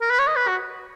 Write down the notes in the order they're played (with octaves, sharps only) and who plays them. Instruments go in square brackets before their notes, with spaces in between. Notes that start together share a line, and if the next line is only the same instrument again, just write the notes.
[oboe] A#4
B4
C#5
D#5
B4
F#4